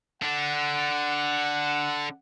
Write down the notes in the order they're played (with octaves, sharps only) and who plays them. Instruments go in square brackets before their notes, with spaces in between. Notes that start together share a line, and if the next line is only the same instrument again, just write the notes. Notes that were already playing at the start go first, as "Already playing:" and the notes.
[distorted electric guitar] D3 D4 [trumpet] F#5